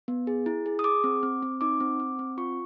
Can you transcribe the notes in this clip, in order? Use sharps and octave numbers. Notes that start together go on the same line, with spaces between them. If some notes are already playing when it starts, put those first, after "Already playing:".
B3
G#4
E4
G#4
D#6
G#4 D6
C4
C4
C4
D#4 D6
C4
C4
C4
F4 C#6